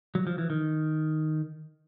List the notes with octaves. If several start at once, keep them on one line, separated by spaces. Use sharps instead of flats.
F#3
F3
E3
D#3